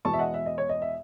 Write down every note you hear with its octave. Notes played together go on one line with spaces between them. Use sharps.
E2 B2 G#3 B3 A5 C#6
E5
D#5 F#5
E5
D#5
C#5
D#5
E5